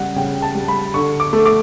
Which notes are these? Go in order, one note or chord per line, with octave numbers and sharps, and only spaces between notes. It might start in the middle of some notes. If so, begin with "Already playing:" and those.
Already playing: C#3 G3 F#5
C#3 G5
A5
G3
B5
D3 C#6
D6
A3
D6